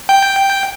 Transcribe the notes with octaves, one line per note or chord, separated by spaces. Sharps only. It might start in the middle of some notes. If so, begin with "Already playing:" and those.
G5